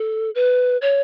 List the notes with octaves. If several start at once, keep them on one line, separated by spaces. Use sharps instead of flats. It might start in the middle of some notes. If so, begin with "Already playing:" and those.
Already playing: A4
B4
C#5